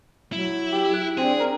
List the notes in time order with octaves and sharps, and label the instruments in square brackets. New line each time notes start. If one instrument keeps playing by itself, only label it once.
[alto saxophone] F#3 [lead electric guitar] E4
[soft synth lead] G4
F#6
[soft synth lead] C4 [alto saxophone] D4 [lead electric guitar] G#4
[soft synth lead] A#4